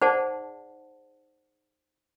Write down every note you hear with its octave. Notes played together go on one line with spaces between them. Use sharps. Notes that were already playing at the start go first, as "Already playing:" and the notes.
D#4 G#4 C5 D5 F#5 A5